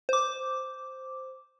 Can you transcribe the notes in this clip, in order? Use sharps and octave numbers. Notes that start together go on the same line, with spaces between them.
C5 D6